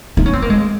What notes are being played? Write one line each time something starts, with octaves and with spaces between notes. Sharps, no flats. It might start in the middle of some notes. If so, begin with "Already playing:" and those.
D#4
C#4
C4
A#3
G#3